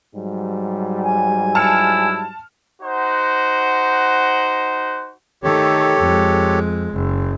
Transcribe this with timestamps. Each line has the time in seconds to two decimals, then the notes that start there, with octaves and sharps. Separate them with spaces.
0.16 G#2 F#3 G3
1.03 G#5
1.55 E4 A5 F6 C#7
2.82 D#4 F#4 C5 F#5
5.43 D#3 A3 G4 A4 C#5
6.01 F2 G#3
6.94 F#1